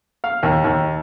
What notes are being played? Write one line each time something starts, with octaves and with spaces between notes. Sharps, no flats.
F5
D#2
D#2